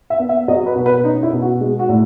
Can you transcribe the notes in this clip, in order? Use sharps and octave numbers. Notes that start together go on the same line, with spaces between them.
E5
B3
E5
F#3 D#5
B4
B2
B4
C#4 D#4
E4
B2
F#4
G#3
F#4
A2